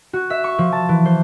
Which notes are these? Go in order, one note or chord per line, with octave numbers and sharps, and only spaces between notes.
F#4
E5
C#6
F3
A5
E3
C5